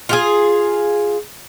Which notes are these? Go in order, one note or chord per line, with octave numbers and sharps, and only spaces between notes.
F4 G4 G#4